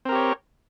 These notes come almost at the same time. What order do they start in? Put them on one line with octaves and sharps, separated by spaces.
C4 A#4 G4 C#5